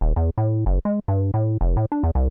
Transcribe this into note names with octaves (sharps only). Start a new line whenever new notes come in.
D#1
E2
A2
F#1
G#3
G2
A2
F1
A2
D4
E2
C2